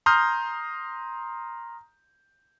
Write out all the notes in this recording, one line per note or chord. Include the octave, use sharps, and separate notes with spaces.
A#5 C6 D#6 F6 G6